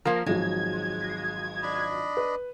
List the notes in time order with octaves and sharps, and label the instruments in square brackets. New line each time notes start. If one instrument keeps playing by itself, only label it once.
[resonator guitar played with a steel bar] F3 A#3 [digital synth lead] A#4
[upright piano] G#1 F3 F#3 [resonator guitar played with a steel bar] G#3 [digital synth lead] G#6
[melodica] D4 D#5 B5
[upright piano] B4